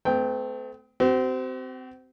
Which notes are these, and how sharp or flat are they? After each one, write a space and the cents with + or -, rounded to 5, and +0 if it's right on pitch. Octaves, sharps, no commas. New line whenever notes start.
A3 -10 C4 -45 G5 +0
C4 -20 F#4 +45